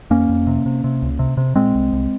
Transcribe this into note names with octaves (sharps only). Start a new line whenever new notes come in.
F2 A#3 C#4
F2
C3
C3
C3
C#2
C3
C3
A#2 G#3 C4
C2
C2